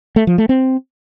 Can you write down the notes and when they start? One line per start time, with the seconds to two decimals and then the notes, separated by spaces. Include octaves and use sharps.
0.16 A3
0.27 F3
0.38 A3
0.49 C4